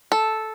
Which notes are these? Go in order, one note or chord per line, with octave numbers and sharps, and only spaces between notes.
A4